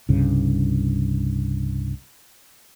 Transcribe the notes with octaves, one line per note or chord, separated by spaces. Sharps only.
C2 G2 C#3